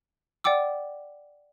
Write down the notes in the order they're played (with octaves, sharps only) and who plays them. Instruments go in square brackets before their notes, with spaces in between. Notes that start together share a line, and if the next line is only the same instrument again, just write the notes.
[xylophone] D5 F#5 G5 D6 E6